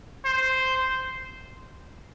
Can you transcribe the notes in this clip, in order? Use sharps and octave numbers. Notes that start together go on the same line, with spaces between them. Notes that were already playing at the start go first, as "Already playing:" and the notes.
C5